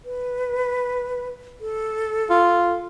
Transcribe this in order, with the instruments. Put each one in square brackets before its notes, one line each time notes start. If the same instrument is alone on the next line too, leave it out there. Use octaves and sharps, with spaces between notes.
[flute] B4
A4
[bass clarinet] F4